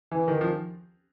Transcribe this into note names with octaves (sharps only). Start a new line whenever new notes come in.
E3
D#3
F3